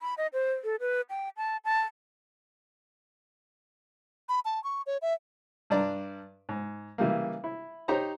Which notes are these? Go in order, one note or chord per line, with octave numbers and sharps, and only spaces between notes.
B5
D#5
C5
A4
B4
G5
A5
A5
B5
A5
C#6
C#5
E5
G2 D4 D5 A#5
G#2
C#3 E3 G3 A#3
E4
D#4 G4 C5 C#5 A#5